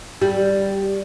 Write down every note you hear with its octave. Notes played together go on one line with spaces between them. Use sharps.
G3